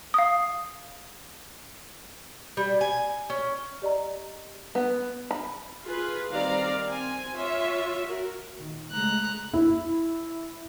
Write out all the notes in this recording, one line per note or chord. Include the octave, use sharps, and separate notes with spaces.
F5 D#6
G3
G#5
C#4
G4 D5 D#5 A#5
B3
B5
F4 G#4 B4
D#3 G3 C4 D5 F5 A#5
C4 G#5
F4 C#5 E5
F#4 A#4
A#2 D#3
C#3 G#3 A3 A#5 F#6
E4